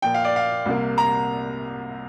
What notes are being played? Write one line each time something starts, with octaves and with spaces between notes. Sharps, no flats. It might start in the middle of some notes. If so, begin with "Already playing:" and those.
A#2 F3 A#3 G5
F5
D5
F5
C2 C3 A#3
A#5